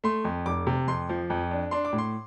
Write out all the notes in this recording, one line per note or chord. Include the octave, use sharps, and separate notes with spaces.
A3 C6
F2
F1 D6
C3
F2 C6
F3
F2
D4
D4 C6
D6
A2
C6